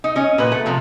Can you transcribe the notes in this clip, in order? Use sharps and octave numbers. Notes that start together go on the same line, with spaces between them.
D#4
C#4 D#5
A#2 B3 B4
A3
C3 F3